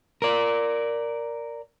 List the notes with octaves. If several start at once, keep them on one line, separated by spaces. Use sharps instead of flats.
A#4 D5